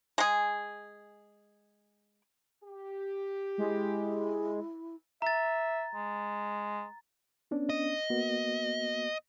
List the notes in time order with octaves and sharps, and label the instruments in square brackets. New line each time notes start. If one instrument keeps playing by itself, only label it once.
[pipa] G#3 G#4
[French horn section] G4
[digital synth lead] G#3 [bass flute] E4
[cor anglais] E5 [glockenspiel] A#5 A6
[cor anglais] G#3
[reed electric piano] B3 C#4 D4
[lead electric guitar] D#5
[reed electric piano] A#3 B3 F#4